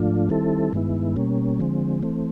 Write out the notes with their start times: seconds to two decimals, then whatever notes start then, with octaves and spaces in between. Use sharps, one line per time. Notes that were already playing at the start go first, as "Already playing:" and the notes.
Already playing: G#2 F3 A3 D4 F4
0.29 D#3 G3 C4 E4 A4
0.73 G2 D#3 G#3 B3 E4
1.16 B2 G3 A#3 C#4
1.60 D3 F3 G#3 C4
2.03 E3 A3 C4